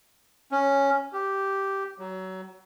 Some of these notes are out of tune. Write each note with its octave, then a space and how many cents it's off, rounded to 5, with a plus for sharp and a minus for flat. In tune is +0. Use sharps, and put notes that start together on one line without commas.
C#4 +0
G4 -5
F#3 +25